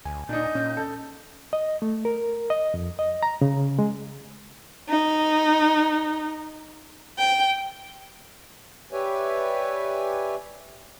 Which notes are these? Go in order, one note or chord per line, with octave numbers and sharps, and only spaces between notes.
D2 G#5
A#2 D4 D#4 D#5 G6
A#2 C#4
A4
D#5
A3
A#4
D#5
F2
D#5
A#5
C#3
G#3
D#4
G5
G4 B4 C#5 D5 E5 G#5